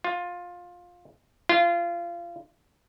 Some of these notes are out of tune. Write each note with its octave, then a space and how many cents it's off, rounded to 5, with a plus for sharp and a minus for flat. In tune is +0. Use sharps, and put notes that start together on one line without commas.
F4 +15
F4 -25